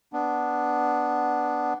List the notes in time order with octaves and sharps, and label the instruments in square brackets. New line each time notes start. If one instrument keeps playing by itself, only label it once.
[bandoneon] B3 D4